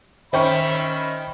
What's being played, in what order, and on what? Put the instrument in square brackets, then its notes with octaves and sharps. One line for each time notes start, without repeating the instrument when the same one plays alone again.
[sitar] D#3 C#4 [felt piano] C5 G5 C#6 [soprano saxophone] E5 [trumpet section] B5